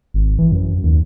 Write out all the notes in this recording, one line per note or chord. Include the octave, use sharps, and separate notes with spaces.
G#1
E3
F#2
D#2